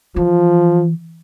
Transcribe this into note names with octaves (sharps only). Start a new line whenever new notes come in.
E3 F3